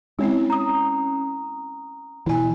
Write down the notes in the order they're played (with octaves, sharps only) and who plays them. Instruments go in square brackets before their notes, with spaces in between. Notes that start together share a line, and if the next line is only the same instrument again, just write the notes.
[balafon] G#3 C4 E4 [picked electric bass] C#4
[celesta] A#5 D#6
[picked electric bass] B2 E3 [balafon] E4 G#5